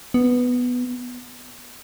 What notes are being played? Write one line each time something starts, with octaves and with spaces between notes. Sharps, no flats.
B3